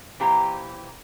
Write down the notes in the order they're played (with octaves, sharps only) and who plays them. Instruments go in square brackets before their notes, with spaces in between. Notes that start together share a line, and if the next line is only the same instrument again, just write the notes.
[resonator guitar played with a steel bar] A#2 E3 G4 C5 A#5